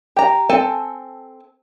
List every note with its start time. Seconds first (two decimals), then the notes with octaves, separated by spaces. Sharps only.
0.16 G4 A#5
0.49 C4 A4 G#5 A5